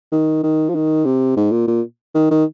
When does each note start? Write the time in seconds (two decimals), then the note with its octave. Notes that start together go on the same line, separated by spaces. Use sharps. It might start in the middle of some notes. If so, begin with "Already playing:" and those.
0.12 D#3
0.43 D#3
0.69 F3
0.75 D#3
1.05 C3
1.37 G#2
1.52 A#2
1.67 A#2
2.15 D#3
2.31 D#3